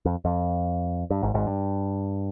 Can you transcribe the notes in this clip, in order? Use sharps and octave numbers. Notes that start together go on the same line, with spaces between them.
F2
F2
G2
G#1 G#2
G#1 G#2
G2